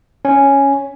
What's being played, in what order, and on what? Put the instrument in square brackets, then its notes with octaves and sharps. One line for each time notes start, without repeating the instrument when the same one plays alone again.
[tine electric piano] C#4